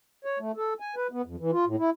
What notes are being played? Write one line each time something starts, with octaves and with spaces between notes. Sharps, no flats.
C#5
A3
A4
G#5
B4
B3
F2
E3
F4
A2
E4